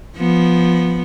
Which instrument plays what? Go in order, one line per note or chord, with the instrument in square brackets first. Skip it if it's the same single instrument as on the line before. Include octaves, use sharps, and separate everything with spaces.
[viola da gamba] F3 B3